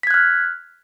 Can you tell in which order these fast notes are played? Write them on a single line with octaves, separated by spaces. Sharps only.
B6 G#6 F#6 F6